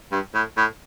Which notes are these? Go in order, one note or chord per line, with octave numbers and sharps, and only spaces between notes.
G2
A2
A2